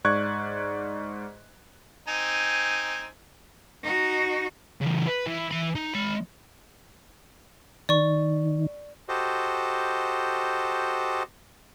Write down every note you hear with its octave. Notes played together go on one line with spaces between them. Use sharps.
G#2 D5 C#6 F#6 G#6
C4 D#4 G#5
D#4 F#4
C#3 E3
B4
E3
E3 B5
D#4
G#3 B5
D#3 D5 C#6
F#4 G4 A4 C5 D#5